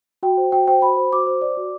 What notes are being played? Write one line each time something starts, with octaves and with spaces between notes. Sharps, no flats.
F#4 G5
C5
F#4 G5
C5 G5
F#4 B5
C5
F#4 D6
C5
D5
F#4